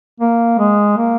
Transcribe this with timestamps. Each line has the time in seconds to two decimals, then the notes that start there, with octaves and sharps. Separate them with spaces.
0.20 A#3
0.58 G#3
0.97 A#3